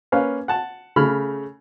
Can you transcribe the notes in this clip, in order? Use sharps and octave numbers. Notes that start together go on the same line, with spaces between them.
A#3 C#4 B4 F5
F#5 A5
C#3 A3 B5 F6